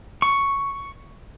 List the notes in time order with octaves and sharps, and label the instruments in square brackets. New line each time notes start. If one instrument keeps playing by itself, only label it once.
[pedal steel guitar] C#6